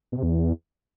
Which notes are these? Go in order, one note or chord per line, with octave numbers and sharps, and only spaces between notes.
B2
C3
E2